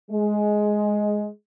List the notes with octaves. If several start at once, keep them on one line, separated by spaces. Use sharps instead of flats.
G#3